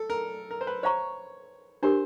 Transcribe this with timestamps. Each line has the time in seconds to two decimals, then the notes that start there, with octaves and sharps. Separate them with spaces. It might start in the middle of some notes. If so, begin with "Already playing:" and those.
Already playing: A4
0.10 A#4
0.51 A#4
0.61 C5
0.67 B4
0.83 C5 C#5 F5 A#5 C#6
1.83 D4 G4 A#4 C5